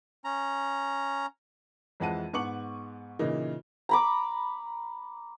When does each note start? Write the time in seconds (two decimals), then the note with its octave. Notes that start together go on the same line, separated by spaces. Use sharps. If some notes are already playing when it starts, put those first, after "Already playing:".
0.24 C#4 A#5
2.00 F2 E3 G#3 F#5 A5 D#7
2.33 G#2 B3 C#6 D6 C#7 F#7
3.19 A#2 C#3 E3 A#3 D#4
3.89 A#5 B5 D6